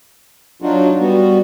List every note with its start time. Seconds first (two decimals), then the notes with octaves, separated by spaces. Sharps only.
0.62 F#3 D4 D#4 F4 F#4
0.99 G3 B3 F#4